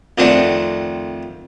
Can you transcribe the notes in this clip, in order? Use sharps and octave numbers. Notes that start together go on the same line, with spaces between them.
F2 D#3 A3 C4 D4 F#5